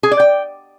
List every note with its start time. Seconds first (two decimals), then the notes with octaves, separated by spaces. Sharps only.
0.03 G#4
0.11 D5
0.20 G5